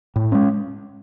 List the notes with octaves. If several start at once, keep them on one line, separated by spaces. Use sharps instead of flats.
A2
G#3 C#4